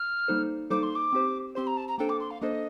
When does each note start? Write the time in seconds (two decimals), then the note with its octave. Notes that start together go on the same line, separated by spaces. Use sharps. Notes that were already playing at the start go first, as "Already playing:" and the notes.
Already playing: F6
0.28 G3 A#3 D#4 A4 C5
0.70 G3 A#3 D#4 A4 C5 D6
0.83 C6
0.95 D6
1.13 C4 G4 C5
1.55 C4 G4 C5 C6
1.67 A#5
1.77 A5
1.88 A#5
1.98 A#3 D4 A4 C5 G5
2.09 D6
2.20 C6
2.30 F5
2.41 A#3 D4 A4 C5 D#5